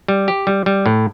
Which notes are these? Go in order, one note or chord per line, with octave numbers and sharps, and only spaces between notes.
G3
G4
G3
G3
A2